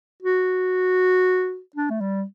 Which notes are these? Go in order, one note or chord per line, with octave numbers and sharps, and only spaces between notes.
F#4
D4
A3
G3